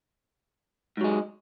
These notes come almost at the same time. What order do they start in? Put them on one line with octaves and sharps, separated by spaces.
G#2 F#3 G#3